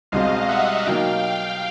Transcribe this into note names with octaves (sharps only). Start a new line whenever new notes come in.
C2 B2 G#3 C4 D#5 F5
E5 F#5
B2 F#3 A#3 D#4 F5 G5
F5 G5